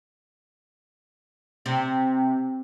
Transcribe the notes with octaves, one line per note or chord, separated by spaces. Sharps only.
C3